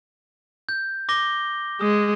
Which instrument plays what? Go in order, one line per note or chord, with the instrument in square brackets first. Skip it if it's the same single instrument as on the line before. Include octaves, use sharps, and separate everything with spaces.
[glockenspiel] G6
D6 A#6 G7
[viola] G#3 [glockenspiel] D#6